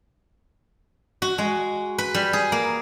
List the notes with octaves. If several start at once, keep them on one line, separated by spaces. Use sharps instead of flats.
F#4
G#3
B4
G3
G#4
A#3